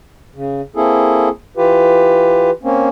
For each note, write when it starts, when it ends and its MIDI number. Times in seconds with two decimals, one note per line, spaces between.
0.35 0.61 49
0.76 1.29 58
0.76 1.29 60
0.76 1.29 64
0.76 1.29 68
0.76 1.29 69
1.57 2.50 52
1.57 2.50 65
1.57 2.50 67
1.57 2.50 71
2.63 2.89 58
2.63 2.89 60
2.63 2.89 61